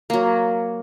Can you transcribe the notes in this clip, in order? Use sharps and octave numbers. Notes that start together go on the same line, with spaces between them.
F#3 A#3